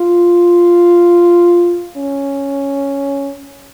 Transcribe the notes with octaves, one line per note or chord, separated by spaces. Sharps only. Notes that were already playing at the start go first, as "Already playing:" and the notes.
Already playing: F4
C#4